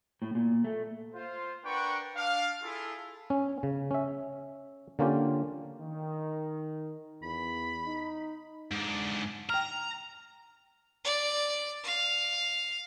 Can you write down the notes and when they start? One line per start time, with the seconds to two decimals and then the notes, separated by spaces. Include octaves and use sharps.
0.22 A2
0.35 A#2
0.64 A3
1.15 F4 C5
1.64 D4 A#4 B4 F#5 G5 C#6
2.16 D4 F5
2.62 E4 F4 G#4 A4
3.30 C#4
3.63 C#3
3.91 C#4 E5
4.99 D3 A#3 C#4 F4 G4
5.80 D#3
7.23 E2 B5
7.86 D#4
8.72 G#2 D4
9.49 G5 A#5 F6
11.05 D5
11.84 F5